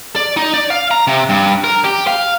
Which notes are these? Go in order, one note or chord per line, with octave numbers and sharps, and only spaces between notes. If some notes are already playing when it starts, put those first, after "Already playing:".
D5
D#4
D5
F5
A#5
C3
G2
A#4
G4
F5